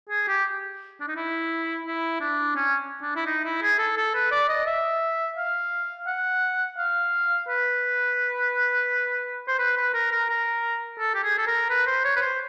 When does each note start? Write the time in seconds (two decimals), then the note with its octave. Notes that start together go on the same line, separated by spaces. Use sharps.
0.10 G#4
0.28 G4
1.01 D4
1.08 D#4
1.16 E4
1.86 E4
2.20 D4
2.56 C#4
3.02 D4
3.16 E4
3.26 D#4
3.45 E4
3.62 G#4
3.79 A4
3.97 A4
4.15 B4
4.31 D5
4.49 D#5
4.67 E5
5.37 F5
6.07 F#5
6.78 F5
7.49 B4
9.48 C5
9.59 B4
9.77 B4
9.94 A#4
10.12 A#4
10.29 A#4
10.99 A4
11.15 G4
11.23 G#4
11.38 A4
11.47 A#4
11.70 B4
11.87 C5
12.05 C#5
12.16 B4
12.22 C5